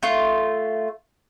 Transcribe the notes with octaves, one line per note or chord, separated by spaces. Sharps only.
A3 F4